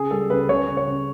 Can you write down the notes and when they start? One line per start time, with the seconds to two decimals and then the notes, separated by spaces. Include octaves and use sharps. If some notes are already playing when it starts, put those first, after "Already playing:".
Already playing: C#3 G#4
0.11 G3 A4
0.30 C#3 B4
0.49 C#3 C#5
0.68 C#3
0.77 C#5
0.87 C#3